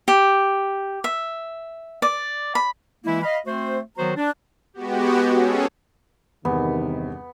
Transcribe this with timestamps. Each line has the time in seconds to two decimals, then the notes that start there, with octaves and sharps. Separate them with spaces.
0.08 G4
1.04 E5
2.02 D5
2.55 B5
3.05 E3 G#3 A#3 E4
3.23 D#5 F5 B5
3.46 A3 C4 F#4 C5
3.98 D#3 F#3 B3 F#4 C5 A#5
4.17 D4
4.74 G#3 B3 F#4 G4
5.34 C#4 G#4 A4 C#5
6.45 E2 G2 C3 D#3 B3